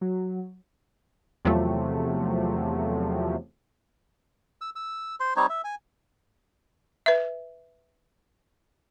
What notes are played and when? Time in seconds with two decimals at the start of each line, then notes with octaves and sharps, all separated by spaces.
0.01 F#3
1.45 E2 C3 F3 F#3 A3
4.61 E6
4.76 E6
5.20 C5 C6
5.36 G3 C4 D#4 C#5
5.49 E5
5.64 G#5
7.06 B4 E5